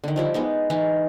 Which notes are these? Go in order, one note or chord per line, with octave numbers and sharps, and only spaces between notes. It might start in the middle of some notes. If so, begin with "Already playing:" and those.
D3 D#3
F3 G3 E4
G#3 B3 D#4
E3 D#4 E4